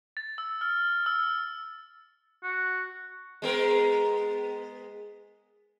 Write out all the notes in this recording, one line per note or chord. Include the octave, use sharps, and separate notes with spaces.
A6
E6
F6
E6
F#4
G#3 B3 A#4